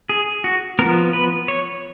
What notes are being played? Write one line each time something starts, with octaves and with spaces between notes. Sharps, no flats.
G#4
F#4
F3 B3 A#4
B4
C#5